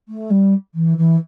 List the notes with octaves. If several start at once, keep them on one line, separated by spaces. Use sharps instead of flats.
A3
G3
E3
E3